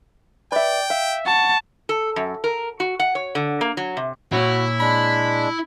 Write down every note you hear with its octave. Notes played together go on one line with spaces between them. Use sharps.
B4 D5 E5 G5
E5 F5
F#5 A5 C#6
A4
F#2
A#4
F#4
F#5
C#5
D3
A#3
F#3
C3
A#2 E4 F#4 C#5
G#3 D4 B5